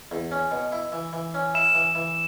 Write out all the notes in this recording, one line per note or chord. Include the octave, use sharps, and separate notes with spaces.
E2
C#4
B2
E4
E3
E3
C#4
E4 E7
E3
E3